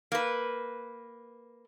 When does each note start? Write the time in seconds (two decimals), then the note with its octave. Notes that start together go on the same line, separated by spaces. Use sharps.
0.12 A#3 B4